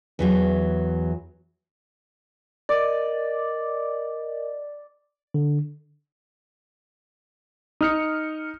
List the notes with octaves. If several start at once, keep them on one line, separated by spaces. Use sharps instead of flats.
E2 E3 F#3
A#4 D5 D#5
D3
D#4 D#6 F6 C#7